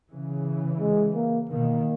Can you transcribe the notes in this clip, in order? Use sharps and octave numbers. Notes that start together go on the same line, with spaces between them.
C#3 E3
G#3
A#3
B2 D#3 A#3